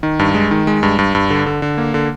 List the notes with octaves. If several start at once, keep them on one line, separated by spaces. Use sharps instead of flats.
D#3
G2
G#3
D#3
G#3
G2
G2
G2
D3
D3
D3
A#3
D3